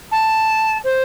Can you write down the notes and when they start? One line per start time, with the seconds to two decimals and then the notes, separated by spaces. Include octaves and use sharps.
0.11 A5
0.84 C5